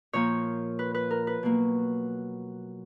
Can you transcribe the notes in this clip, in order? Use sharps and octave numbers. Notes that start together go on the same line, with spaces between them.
A#2 F3 A#3 C#5
B4
B4
A#4
B4
B2 F#3 A#3